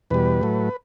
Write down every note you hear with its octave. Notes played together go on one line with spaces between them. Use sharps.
E2 B2 G3 B4
A2 F#3 A3